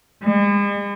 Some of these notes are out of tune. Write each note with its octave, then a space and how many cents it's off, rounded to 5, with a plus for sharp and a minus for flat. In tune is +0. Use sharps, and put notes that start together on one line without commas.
G#3 -45